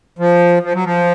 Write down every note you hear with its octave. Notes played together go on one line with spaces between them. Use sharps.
F3
F3
F#3
F3